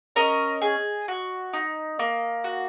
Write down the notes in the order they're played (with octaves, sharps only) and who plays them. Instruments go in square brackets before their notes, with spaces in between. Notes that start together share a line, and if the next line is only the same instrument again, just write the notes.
[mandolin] C#4 A#4 D#5
G#4
F#4
D#4
A#3
F#4